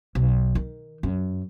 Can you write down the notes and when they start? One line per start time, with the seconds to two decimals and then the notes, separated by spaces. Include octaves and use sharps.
0.15 B1
0.55 D#3
1.03 F#2